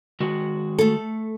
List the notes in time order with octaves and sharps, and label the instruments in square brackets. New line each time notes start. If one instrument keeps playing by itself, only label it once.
[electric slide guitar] D#3 G#3 F#4
[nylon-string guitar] A3 A4